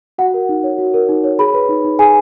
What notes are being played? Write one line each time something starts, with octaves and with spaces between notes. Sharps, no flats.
F#4 F#5
A#4
D#4
C#5
F#4
A#4
D#4
C#5
G#4 B5
B4
D#4
D#4
G#4 G#5